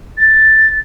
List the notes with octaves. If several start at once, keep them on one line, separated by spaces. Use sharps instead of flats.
A6